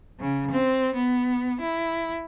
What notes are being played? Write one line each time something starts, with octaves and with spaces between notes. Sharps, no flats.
C#3
C4
B3
E4